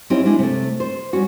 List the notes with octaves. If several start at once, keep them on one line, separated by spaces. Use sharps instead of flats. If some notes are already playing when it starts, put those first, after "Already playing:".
F#3 C4 C#4 D#4 E4 G4
G#3 D4 E4
C3 A3
C5
G3 C#4 F#4